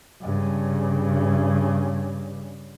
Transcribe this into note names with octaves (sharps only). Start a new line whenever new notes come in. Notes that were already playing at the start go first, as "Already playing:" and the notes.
G2 C#3